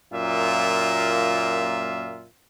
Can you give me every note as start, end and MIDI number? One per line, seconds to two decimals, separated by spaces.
0.12 2.26 42
0.12 2.26 46
0.12 2.26 58
0.12 2.26 65
0.12 2.26 76